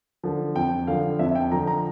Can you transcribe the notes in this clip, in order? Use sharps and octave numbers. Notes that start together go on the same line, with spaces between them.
D3 F3
F2 G5
D3 F3 F5
F2 E5
G5
D3 F3 A#5
A#5